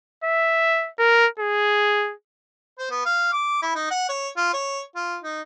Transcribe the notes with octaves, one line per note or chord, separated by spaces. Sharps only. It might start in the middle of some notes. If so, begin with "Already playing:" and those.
E5
A#4
G#4
C5
B3
F5
D6
E4
D#4
F#5
C#5
F4
C#5
F4
D#4